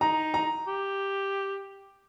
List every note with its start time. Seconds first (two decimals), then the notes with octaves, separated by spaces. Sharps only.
0.01 D#4 A#5
0.34 A#5
0.67 G4